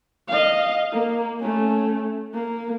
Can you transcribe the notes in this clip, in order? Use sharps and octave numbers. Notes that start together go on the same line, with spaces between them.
D#5 F5
A#3
A3 C#4
A#3